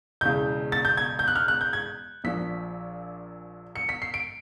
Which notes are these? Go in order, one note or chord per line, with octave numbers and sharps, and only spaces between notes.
E1 E2 C#3 G6
A6
G6
G#6
G6
F#6
F6
F#6
G6
G#6
A#1 A#2 F3 B6
C#7
B6
C7
D7